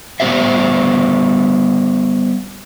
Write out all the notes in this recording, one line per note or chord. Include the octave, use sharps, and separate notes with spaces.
G3 B3 G4 C5 E5